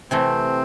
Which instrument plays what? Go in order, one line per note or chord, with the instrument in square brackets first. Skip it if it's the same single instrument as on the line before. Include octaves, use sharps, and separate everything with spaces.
[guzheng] C3 E3 A3 [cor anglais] C4